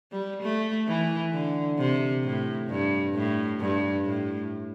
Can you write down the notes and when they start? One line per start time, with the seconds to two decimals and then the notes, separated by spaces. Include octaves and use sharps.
0.12 G3
0.42 A3
0.87 E3
1.33 D3
1.78 C3
2.24 A2
2.69 G2
3.14 A2
3.60 G2
4.05 A2